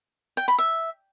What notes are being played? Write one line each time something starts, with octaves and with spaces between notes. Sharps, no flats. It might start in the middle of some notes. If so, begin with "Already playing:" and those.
G5
B5
E5